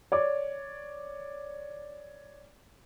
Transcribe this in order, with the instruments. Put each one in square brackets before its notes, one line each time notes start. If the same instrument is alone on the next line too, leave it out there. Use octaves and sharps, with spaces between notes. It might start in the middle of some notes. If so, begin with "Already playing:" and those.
[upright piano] C#5 D5 D6